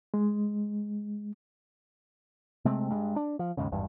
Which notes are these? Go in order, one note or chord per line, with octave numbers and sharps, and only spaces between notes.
G#3
C3 G#3 A3 C4
G2 G#3
D4
F3
D#2 G#2 C#3
G#1 E2 G2